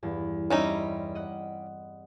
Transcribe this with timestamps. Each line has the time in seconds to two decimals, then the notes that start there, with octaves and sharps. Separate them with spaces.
0.03 E2 G2
0.50 G3 C4 C#4 D#4 E5
1.15 D#5 F#5